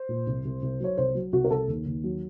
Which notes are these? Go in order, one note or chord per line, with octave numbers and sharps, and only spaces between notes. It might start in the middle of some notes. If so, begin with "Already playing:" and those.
Already playing: C5
A#2
C2
C2
C2
F#3 C#5
C2 C5
F#3
C2 F#4
A#4
C2 A4
D#2
D#2
F#3